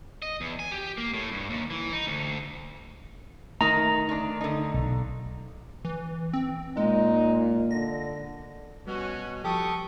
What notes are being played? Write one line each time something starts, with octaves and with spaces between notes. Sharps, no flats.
D#5
E2
G#5
G4
A#3
A2
G2
D#2
E3
D#4
D2
D#3 A3 D#4 A#5
D#3 D4
D3 D#4
B1
E3
C4
A#2 G#3 D#4
D3 A#6
B2 G3 C#4 F#4
F3 G4 A4 C#6 D#6